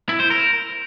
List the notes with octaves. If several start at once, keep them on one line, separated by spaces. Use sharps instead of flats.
E4
C5
A#4